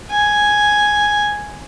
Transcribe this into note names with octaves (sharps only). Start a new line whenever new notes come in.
G#5